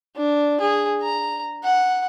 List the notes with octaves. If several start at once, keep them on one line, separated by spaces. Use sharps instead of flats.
D4
G#4
A#5
F#5